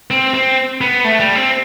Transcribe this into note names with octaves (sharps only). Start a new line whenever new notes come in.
C4
C4
B3
A3
G3
C4